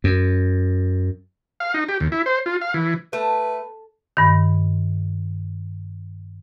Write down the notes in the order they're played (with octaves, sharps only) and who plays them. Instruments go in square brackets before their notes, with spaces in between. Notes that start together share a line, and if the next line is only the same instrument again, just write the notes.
[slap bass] F#2
[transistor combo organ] F5
D#4
G4
D#2
E4
C5
F4
F5
E3
[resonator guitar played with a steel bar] A3 [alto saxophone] B4
[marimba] G2 D#3